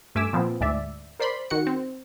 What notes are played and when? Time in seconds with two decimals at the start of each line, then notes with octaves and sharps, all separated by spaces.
0.15 G2 A3 E5 G#5 D6 E6
0.33 A#2 F3 B3 C4
0.61 D2 G#2 D5 E5
1.20 A#4 C5 D5 B5 C6
1.50 D#3 F#4 F#5 C#7
1.67 C4